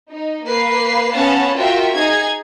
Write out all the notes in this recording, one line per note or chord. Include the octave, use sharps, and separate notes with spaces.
D#4
A#3 B4 C7
B3 C#4 F5 F#5 A5
F4 F#4 A#4 E5 G5
D#4 G#4 G#6